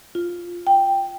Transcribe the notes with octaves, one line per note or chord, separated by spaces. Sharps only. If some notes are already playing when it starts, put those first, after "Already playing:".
F4
G5